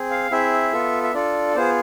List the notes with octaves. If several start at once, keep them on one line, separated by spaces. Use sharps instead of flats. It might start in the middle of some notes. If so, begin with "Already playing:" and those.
Already playing: C4 G#4
F5
C4 E4 G#4 E5
B3 F4 A4
E5
D4 F4 A4 D5
B3 F4 G#4 C5